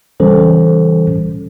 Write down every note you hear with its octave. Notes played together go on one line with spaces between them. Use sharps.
C#3 E3 G3 C#4 A4 C5